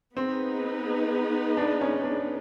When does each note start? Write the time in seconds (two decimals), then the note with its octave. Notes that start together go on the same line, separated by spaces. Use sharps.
0.16 B3 C4 D#4 G#4 B4
1.57 D4
1.81 C#4
2.04 D4